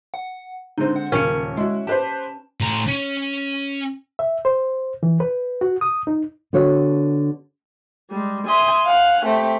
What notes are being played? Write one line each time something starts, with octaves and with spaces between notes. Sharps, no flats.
F#5
D3 G#3 C4 D#4
F#5
D#1 C#3 C#4 A#4 C#7
G#3 E4 F#4
G4 B4 C5 A5
A2 A#5
C#4
E5
C5
E3
B4
F#4
D#6
D#4
D3 B3 F#4 C#5
G3 G#3
E5 G#5 C6 D#6
F5 F#5 G#5
A3 C4 G4